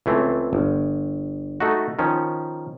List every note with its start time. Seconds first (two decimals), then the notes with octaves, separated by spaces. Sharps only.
0.06 C#2 E3 A3 C4
0.53 G1
1.60 A3 D#4 F#4
1.99 D#3 F3 C#4